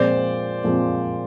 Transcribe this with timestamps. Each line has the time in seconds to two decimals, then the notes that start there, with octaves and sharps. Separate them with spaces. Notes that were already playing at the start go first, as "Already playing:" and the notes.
Already playing: A#2 F3 G#3 C4 C5 D5
0.64 A#2 F3 G#3 C4